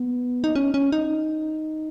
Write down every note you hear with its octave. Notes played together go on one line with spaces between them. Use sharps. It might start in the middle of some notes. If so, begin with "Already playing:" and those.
Already playing: B3
D#4
C#4
C#4
D#4